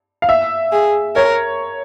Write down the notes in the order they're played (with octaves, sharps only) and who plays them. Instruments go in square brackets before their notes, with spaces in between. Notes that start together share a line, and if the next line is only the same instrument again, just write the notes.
[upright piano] F5
E5
[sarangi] G#4
[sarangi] A#4 [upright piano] C#5